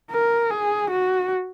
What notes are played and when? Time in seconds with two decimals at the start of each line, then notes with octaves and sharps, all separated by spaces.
0.11 A#4
0.51 G#4
0.91 F#4